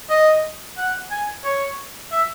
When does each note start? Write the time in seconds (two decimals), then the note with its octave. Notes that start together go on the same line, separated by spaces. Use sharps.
0.10 D#5
0.78 F#5
1.11 G#5
1.44 C#5
2.12 E5